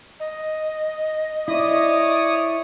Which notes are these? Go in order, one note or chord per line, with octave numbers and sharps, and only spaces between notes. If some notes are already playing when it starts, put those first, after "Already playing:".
D#5
E4 C#5 D5 D#6